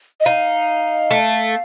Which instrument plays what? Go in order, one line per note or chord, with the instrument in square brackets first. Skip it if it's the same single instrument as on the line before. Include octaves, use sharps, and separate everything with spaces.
[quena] D#5
[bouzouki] D#4 [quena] F5
[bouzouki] A3